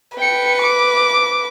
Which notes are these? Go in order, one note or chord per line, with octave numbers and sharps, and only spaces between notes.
B4 G5 C#7
D6